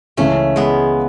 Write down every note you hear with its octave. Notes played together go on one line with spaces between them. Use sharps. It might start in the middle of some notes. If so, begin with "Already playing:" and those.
C#2 C#3 E3 A3 C#4
G#3 B3